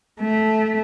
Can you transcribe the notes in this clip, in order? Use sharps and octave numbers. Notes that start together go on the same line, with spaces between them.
A3